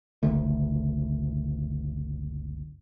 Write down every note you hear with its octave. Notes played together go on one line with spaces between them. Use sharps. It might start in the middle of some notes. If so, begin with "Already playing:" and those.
F#1 C#2 D3 A3